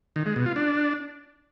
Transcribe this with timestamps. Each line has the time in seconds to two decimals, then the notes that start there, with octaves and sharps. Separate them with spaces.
0.16 D#3
0.26 G#3
0.36 B2
0.46 F4
0.56 D4